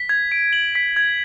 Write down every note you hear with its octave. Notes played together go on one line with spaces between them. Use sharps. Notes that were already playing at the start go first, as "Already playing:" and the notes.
Already playing: B6
G#6
D7
F#7
B6
G#6